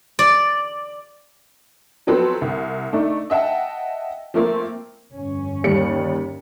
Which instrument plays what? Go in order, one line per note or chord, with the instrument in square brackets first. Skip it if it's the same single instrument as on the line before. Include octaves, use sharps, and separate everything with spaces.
[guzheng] D5
[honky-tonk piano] F3 F#3 B3 C4 A4 B4
C2
A3 D4 D#4
D#5 E5 F#5 G5 A5
F3 A3 A#3 C4
[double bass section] G1 F2 C#4
[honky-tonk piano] D#2 G3 C#7